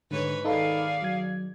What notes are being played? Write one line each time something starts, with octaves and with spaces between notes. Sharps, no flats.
G#2 D3 B4 C#5
D#3 D#4 G#4 A4 D5 F5 B5
F#3 G#6